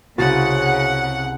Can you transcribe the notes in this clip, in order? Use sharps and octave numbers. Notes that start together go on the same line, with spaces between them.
C2 C#3 F#4 F#5 A6